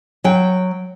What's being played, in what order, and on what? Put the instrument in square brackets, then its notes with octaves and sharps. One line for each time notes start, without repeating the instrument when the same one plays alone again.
[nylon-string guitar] F#3 G5